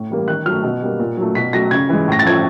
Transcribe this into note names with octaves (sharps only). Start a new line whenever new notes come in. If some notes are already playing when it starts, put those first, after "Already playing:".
Already playing: A2
E3 G3 A#3
D#3 F#6
F#3 A3 F6
B2
G3 A#3
A#2
F#3 A3
B2 B6
F#3 A3 A#6
C#3 G#6
E3 G#3
A2 A#6
A6
F3 A3 G#6